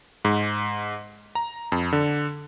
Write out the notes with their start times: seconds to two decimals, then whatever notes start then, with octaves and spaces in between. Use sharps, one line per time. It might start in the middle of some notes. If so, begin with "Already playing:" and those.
0.25 G#2
1.35 A#5
1.72 F2
1.93 D3